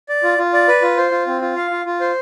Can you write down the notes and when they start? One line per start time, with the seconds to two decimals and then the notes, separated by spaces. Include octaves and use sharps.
0.09 D5
0.23 F4
0.38 F4
0.53 D5
0.68 B4
0.82 F4
0.97 C5
1.11 F4
1.27 C4
1.41 F4
1.56 F5
1.71 F4
1.85 F4
2.00 C5